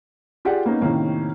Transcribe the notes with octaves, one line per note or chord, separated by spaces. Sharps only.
F4 G4 G#4 D5 F#5
A#3 B3 C#4 D#4
A2 C3 D#3 A#3 C#4